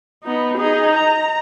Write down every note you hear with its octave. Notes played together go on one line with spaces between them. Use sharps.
B3 D#4
D#4 G#4
A#5